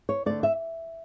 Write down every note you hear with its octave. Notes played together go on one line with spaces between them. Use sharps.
C#5
D3 A3 D5
E5